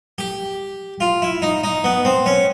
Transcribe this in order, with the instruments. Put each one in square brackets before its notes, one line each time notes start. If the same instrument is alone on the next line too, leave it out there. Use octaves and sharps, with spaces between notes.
[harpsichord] G4
F4
E4
D#4
D#4
B3
C4
C#4